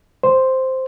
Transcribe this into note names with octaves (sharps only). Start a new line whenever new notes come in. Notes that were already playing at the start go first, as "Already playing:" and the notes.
C5